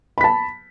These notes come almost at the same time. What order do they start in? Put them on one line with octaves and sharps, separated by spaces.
B5 B6 A5